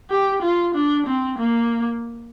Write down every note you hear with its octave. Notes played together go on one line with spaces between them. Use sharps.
G4
F4
D4
C4
A#3